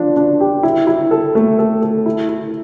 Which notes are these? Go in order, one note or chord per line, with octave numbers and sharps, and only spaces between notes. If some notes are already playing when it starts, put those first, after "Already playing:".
Already playing: F3 D4
D4
G4
E4
E4
A4
A3
A4
A4
E4
E4